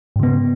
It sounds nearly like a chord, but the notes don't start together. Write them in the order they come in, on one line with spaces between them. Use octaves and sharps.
G#2 C#3 B3